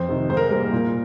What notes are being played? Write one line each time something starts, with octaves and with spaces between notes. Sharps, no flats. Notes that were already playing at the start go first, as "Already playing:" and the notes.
Already playing: F2 C5
C3 D#3
G#2 C5
A#4
G3 A#3 A#4
A#2